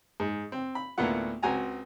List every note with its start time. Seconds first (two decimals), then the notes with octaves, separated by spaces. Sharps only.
0.20 G#2
0.52 C4
0.75 B5
0.98 D2 A2 A#3 B3 F4 F#5
1.43 C#2 C4 F#4 G#5 A#5